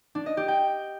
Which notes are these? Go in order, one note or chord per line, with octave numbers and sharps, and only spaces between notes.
D4
D#5
G4
G5